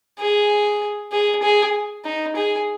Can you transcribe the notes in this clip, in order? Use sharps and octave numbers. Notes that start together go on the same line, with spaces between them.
G#4
G#4
G#4
D#4
G#4